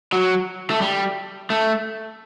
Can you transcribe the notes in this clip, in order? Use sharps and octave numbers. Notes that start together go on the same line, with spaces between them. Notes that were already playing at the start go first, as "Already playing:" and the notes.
F#3
A3
G3
A3